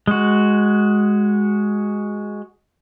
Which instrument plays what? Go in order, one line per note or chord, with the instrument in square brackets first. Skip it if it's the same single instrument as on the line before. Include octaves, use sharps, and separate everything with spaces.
[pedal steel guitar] G#3 F#4